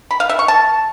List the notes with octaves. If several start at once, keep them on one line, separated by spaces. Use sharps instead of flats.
B5
F5
E5
C#6
A5